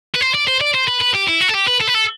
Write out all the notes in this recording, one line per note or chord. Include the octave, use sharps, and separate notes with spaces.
B4
C5
D5
C5
D5
C5
B4
B4
G4
E4
F#4
A4
G4
B4
A4
B4
A4